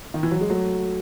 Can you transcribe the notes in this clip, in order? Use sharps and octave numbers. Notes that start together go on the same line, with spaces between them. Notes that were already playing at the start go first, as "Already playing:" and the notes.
D#3
E3
F#3
G#3
F#3 A3